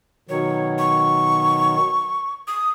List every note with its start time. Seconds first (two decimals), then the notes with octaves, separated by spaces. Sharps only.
0.29 B2 D#3 F#3 C#5
0.79 C#6
2.48 D#6